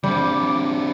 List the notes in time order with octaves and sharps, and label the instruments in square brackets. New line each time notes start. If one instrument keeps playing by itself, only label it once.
[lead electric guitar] D3 C4 [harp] G3 [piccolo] D6